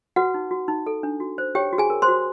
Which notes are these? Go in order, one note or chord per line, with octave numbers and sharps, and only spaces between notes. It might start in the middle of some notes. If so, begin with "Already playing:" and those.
F#4 B4 F#5
D#4
F#4
D#4
A4
D4
F#4
C5
G4 C#5 G5
F#4
G#4 G#5
A#4
C5 C6
F#4